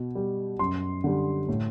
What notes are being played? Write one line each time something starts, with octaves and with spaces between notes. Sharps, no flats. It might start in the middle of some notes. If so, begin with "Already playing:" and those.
Already playing: B2
G3
F#2 C6
D3 G3
A2